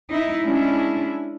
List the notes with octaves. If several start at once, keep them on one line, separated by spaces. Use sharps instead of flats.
D#4 E4
G#3 C#4 D4 E4